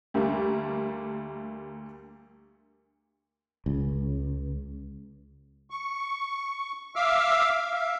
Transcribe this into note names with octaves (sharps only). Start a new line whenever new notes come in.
D2 G3 A3 A#3
C#2
C#6
E5 F5 D6 E6 F6
E5 F5